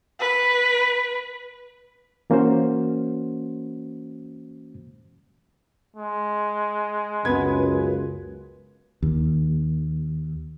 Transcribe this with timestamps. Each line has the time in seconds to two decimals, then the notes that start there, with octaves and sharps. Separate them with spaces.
0.20 B4
2.30 E3 A#3 C#4 F#4 C5
5.97 G#3
7.25 C#2 F#2 B3 B4 G#6
9.02 D#2